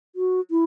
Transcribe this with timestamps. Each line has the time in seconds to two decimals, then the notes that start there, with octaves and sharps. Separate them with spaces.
0.16 F#4
0.51 E4